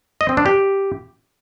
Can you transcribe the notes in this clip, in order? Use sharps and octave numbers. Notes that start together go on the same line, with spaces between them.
D#5
C4
D4
G4